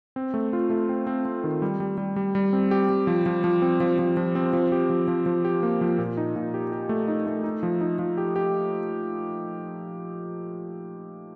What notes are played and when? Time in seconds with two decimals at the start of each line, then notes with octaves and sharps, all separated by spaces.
0.16 C4
0.34 A3
0.53 F4
0.70 A3
0.89 C4
1.07 C4
1.25 C4
1.44 D#3
1.62 G3
1.80 G3
1.98 G3
2.16 G3
2.35 G3
2.53 C4
2.71 G4
2.89 G3
3.07 F3
3.26 F3
3.44 F3
3.62 C4
3.80 F3
3.99 F3
4.17 F3
4.35 C4
4.53 F3
4.72 G4
4.90 F3
5.08 F3
5.26 F3
5.45 G4
5.63 A#3
5.81 F3
5.98 A#2
6.17 D#4
6.36 A#2
6.54 G4
6.72 G4
6.89 A3
7.08 D#4
7.27 A3
7.44 D#4
7.63 F3
7.81 D#4
7.99 F3
8.18 G4
8.36 G4